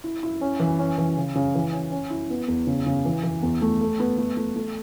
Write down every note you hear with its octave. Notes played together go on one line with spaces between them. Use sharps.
E4
E4
C#4
E3
C#4
E3
C#3
C#3
E3
C#4
C#4
E4
B3
E2
C#3
C#3
E3
E3
E2
A3
A4
B3
A3
A3
A3